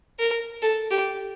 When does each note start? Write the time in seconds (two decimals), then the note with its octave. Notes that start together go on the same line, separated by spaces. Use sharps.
0.19 A#4
0.62 A4
0.91 G4